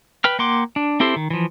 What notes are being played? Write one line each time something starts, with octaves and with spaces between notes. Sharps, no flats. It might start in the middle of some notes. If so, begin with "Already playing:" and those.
B4 G5 F6
A#3 F#5 G5 C6 D6
D4
C4 E4 G4 A4 C5
D#3
E3 F3